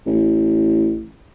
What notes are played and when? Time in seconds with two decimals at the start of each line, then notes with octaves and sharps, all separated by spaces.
0.06 A1